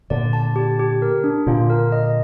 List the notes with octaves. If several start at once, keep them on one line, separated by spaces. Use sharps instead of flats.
A#2 D3 D5
A5
G4
G4
A#4
D4
A#2 D3 F4
A#4
D#5